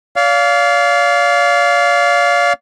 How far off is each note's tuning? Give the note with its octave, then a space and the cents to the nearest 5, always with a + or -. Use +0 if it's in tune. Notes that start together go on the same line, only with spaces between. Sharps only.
D5 -40 F5 +0